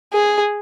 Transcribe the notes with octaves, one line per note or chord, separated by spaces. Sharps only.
G#4